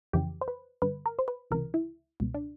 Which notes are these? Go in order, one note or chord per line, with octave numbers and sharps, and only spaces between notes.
F2 C#3 E3 G4
C5
B4
G2 D3 B4
A#4
C5
B4
C#2 C3 E3 A#4
E4
C#2 B2
D4